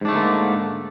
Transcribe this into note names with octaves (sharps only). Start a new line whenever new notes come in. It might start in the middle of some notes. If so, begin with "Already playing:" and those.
G#2 D3 A3 A#3 D4